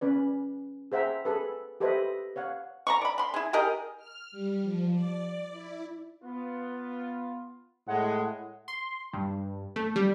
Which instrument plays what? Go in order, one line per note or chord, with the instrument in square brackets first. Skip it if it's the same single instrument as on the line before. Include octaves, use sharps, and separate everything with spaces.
[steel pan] C#4 B4 D5
G#4 C5 E5 F#5 G5 A#5
G#4 A4 B4
G4 A4 B4 C5 D#5 E5
C#5 F5 F#5
[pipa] A#5 B5 C#6
D5 B5
B5 C6
E4 G#4
G4 G#4 A#4 D#5
[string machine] F6
G3
F3
D5
E4
[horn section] B3 F4
[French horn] A2 [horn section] G#3 [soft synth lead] F#5
[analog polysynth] C6
G2
A3
G3